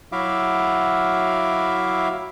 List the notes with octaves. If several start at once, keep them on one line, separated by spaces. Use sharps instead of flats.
F#3 E4 F#4 E5 F5 D6